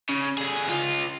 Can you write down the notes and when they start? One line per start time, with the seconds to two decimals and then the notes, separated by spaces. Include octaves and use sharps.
0.09 C#3
0.38 D3 G#4
0.68 C#2 F4